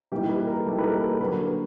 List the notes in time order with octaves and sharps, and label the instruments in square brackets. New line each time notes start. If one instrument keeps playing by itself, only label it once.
[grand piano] E3 G3 A#3 D#4 [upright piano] G4
[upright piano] B4
A#4
[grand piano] E3 G3 A#3 D#4 [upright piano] A4
[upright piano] B4
A#4
A#4
[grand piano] D3 F#3 A#3 [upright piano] B4
[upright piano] A#4